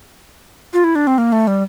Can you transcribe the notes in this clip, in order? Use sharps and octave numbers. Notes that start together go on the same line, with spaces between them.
F4
E4
D4
C4
A#3
A3
G3